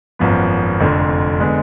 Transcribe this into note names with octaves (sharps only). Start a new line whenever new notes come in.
G#1 F#2 F3 B3
F1 F2 D3
D3 G#3 B3